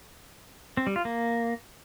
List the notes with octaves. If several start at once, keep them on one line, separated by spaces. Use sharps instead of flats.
C4
G3
F4
A#3